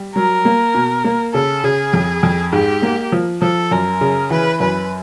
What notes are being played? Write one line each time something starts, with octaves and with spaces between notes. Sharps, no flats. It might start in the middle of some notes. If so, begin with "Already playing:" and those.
Already playing: G3
F#3 A#4
A#3
B2
A#3
C#3 A4
C#3 G#4
F2
F2
G#2 G4
A#3
F3
F3 A4
F#2 A#4
C#3
E3 B4
F#2 B4